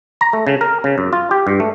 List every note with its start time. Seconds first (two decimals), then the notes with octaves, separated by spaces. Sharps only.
0.21 A#5
0.33 A3
0.47 C#3
0.61 A#4
0.84 C#3
0.98 F#2
1.13 F4
1.31 G4
1.47 G2
1.60 A3